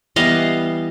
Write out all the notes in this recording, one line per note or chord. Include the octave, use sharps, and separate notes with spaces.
E3 G3 B3 D#5 F5